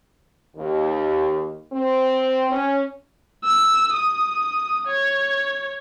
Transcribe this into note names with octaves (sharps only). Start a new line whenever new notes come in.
D#2
C4
C#4
E6
D#6
C#5